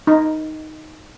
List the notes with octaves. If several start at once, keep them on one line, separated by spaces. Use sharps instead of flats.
D#4